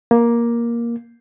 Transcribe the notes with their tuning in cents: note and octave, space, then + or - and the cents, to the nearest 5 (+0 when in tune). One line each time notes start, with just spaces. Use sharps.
A#3 +10